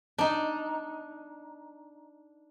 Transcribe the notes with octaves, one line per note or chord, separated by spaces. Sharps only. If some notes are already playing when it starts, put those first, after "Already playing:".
D4 D#4